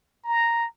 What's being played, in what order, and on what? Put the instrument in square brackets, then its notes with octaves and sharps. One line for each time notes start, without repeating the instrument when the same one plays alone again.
[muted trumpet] A#5